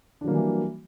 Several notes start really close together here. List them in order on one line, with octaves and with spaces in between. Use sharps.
D4 F#3 A#3 G3 E3